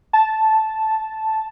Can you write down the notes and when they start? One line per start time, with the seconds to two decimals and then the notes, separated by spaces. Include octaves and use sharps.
0.13 A5